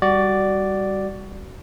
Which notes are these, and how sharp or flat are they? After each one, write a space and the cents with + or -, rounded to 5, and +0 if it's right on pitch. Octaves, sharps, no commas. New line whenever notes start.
G3 +5 F#4 +20 D5 +0